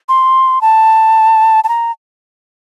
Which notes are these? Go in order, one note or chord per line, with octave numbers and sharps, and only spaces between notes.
C6
A5
A5
A#5